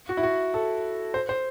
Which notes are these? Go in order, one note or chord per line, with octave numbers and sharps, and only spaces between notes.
F#4
E4
F#4
A4
C5
C5